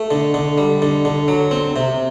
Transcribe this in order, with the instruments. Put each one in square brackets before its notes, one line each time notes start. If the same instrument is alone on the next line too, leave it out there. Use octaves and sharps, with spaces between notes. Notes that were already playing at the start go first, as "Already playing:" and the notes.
Already playing: [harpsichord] A3
D3
D3
G3
D3
D3
F#3
C4
C3